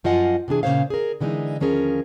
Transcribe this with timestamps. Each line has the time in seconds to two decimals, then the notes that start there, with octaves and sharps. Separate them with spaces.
0.04 F#2 F3 F4 D#5 F#5 G#5
0.48 C3 E3 D4 G#4
0.63 A#2 C#3 A3 C5 C#5 F5
0.90 G#4 A#4
1.20 D3 E3 G#3 D4 D#4
1.60 D#2 F3 C#4 G#4 A#4